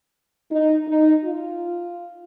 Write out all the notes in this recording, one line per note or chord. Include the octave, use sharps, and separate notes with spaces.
D#4
D#4
F4